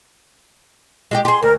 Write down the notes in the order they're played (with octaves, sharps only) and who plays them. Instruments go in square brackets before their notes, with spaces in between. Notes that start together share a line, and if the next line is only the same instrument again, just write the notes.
[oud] G#3 F#4 G4
[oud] G4 G#4 [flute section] C6
[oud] D2 [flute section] A#4